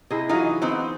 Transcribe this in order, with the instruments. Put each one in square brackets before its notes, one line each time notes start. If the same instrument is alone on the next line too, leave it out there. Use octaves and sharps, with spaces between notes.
[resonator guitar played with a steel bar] C3 [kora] E4 G#4 D#5
[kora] E3 F#3 [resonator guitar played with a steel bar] D#4 F4 D#5
[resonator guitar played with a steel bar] B3 C4 D#4